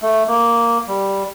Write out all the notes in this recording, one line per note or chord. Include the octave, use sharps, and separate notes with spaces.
A3
A#3
G3